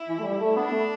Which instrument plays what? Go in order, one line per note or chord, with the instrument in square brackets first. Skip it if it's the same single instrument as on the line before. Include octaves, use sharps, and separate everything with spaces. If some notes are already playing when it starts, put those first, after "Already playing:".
Already playing: [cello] E4
[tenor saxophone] E3
A3
G3
A3
[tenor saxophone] B3 [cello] D4
[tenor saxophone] A3